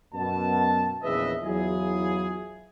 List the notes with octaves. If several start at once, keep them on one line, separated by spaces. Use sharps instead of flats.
F#2 B2 A5
A#1 E2 C#3 B4 D#5 E5
E2 F#3 E4 F4 G#4